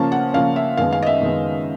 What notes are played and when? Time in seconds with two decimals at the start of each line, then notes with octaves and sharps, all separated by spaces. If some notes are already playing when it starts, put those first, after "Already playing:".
Already playing: C#3 F3 A#3 C#4 A5
0.12 F#5
0.33 C#3 F3 A#3 C#4 F5
0.56 E5
0.77 F#2 D#3 G#3 B3 F5
0.93 F5
1.03 D#5
1.06 E5
1.21 F#2 D#3 G#3 B3